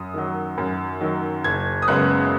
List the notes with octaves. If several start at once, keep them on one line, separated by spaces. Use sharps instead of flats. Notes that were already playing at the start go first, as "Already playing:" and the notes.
Already playing: F#2 D#6
D#3 F#3
F#2
D#3 F#3
F#1 G#6
D#6
F#2 C#3 G#3 B3 F#6